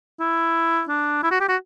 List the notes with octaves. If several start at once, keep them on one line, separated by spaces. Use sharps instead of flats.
E4
D4
E4
F#4
G4
F#4